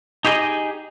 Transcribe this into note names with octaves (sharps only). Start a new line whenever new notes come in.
D#4 G4 G#4 C5 D#5